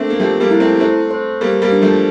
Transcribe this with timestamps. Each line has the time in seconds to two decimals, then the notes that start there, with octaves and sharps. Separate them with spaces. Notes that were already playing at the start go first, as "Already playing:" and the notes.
Already playing: A3 A#3 C4 D4
0.10 A#3
0.20 F3 A3 G4
0.40 G3 A#3
0.51 E4
0.60 A3 C4
0.80 A3 C4 C5
1.11 C5
1.41 G3 A#3 C5
1.62 G3 A#3
1.72 D4
1.82 F3 A3